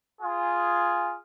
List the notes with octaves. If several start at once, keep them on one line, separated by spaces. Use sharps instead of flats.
F4 G#4